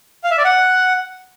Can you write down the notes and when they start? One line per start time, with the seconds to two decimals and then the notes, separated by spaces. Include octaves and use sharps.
0.24 F5
0.31 E5
0.38 D5
0.45 F#5